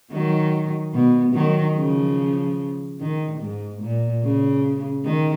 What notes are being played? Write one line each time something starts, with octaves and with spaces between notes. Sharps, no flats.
D#3 F#3
B2
D#3 F#3
C#3 F3
D#3
G#2
A#2
C#3
D#3